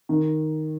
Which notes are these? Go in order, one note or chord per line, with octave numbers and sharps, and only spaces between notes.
D#3